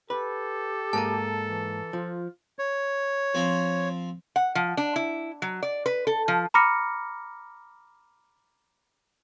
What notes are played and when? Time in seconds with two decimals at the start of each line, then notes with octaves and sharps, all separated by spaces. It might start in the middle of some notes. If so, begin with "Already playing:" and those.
0.10 G4 A4 B4
0.93 G#2 A#3 A5 A#5
1.45 E3
1.93 F3 F4
2.59 C#5
3.34 F3 C4
4.36 F#5
4.55 F3
4.77 D4
4.96 E4
5.42 F#3
5.63 D5
5.86 B4
6.07 A4
6.28 F3
6.54 A#5 B5 D6 F6 A#6 C#7